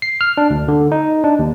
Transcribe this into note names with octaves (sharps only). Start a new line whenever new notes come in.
C7
F6
D4
D2
D3
D#4
D4
D#2